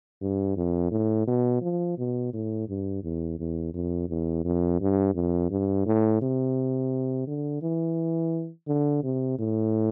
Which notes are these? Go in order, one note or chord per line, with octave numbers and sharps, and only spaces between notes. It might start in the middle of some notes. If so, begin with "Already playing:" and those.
G2
F2
A2
B2
F3
B2
A2
G2
E2
E2
F2
E2
F2
G2
F2
G2
A2
C3
D3
E3
D3
C3
A2